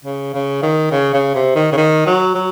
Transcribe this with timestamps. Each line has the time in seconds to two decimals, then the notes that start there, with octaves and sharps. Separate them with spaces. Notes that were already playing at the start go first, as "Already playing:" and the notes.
0.05 C#3
0.34 C#3
0.63 D#3
0.92 C#3
1.14 C#3
1.35 C3
1.56 D#3
1.73 C#3
1.77 D#3
2.07 F#3
2.35 F#3